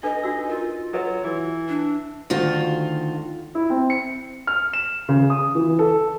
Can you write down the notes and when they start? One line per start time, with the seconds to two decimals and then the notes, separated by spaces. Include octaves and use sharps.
0.03 D4 D#4 A4 B4 D#5
0.23 D4 F#4 E6
0.49 F4 A#4
0.93 F#3 A4 B4 D#5
1.24 E3
1.69 D4
2.30 D2 D#3 F4 F#4
3.55 E4
3.70 C4
3.90 C#7
4.47 F6
4.73 E7
5.09 C#3
5.30 D#6
5.55 E3
5.79 A4